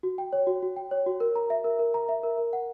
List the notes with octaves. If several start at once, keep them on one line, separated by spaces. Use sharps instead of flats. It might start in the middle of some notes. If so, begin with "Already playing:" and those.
F#4
G5
C#5
F#4
F#4
G5
C#5
F#4
A#4
A#5
E5
A#4
A#4
A#5
E5
A#4
A#4
F#5